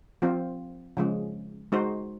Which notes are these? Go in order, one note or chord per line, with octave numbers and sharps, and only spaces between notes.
F3 C4 F4
C#3 F3 G#3
G#3 D#4 F#4 C5